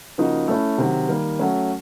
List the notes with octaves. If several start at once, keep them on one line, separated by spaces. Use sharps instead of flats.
C#3 F3 A#3 D#4 F#4
A3 C#4 E4
C3 D#3 F#3
D#3 G3 A#3
F#3 A3 C#4